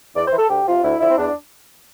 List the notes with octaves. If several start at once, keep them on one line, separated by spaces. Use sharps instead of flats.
E2 D5
C5
E3
A4
D2 G4
C3 F3 F4
D2 E4
D3 F3 E4
C4
E2 D4